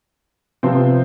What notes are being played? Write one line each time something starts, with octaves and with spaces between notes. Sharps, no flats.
C3 F3 B3 C4 C5